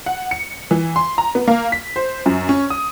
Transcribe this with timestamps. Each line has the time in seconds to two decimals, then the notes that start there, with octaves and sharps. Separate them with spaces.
0.06 F#5
0.31 C#7
0.71 E3
0.96 C6
1.18 A#5
1.35 B3
1.47 A#3
1.72 B6
1.96 C5
2.26 F#2
2.49 C#4
2.70 D#6